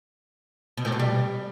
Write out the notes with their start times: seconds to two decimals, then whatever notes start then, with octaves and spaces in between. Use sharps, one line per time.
0.77 B2
0.85 A2
0.92 B2
0.99 G3